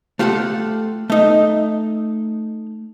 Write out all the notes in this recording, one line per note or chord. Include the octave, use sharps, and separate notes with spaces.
A3 F4 G4 A4 F#5
A3 D#4